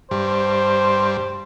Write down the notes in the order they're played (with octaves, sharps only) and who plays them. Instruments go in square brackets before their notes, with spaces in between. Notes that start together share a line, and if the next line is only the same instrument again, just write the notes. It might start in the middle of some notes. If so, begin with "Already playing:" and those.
[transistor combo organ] G2 [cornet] C5